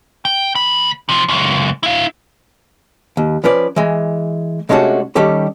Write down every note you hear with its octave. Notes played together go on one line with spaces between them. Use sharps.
G5
D2 B5
C3 F3
C#2 F#2
E4 F5
D#2
F3 C#4 B4 D5
E3 G#3
C3 G#3 A3 C#4 D4 F#4
D#3 G3 C#4 G4 A4